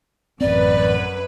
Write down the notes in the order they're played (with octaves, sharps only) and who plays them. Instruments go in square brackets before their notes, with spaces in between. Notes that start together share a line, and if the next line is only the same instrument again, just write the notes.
[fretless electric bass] A1 C4 [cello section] F#2 B4 [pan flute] D5